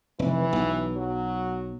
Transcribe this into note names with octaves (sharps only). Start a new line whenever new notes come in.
F1 E3
B1
F#3